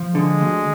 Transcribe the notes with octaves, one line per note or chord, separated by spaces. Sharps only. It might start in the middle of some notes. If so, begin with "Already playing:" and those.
Already playing: F3
D3 G#3
D2